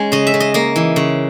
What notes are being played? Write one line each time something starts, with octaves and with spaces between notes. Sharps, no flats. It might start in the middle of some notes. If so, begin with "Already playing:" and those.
Already playing: G#3 C#4 C#5
C#3 D#5
E5
C#3
D#5
A#3 D#5
E3
C#3